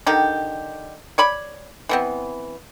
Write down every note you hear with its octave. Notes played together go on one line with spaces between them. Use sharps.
D3 D#3 G4
C#5 D5 B5
E3 B3 C4